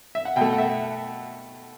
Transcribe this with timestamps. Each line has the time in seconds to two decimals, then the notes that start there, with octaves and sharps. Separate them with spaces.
0.15 E5
0.25 F#5
0.36 B2 A3 G5
0.53 F#5
0.58 E5